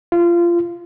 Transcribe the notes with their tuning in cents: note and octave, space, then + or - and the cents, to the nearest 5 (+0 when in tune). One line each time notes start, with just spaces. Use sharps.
F4 -25